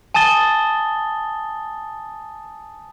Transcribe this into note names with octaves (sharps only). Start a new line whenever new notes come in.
G#5 A5 D#6 A6 G7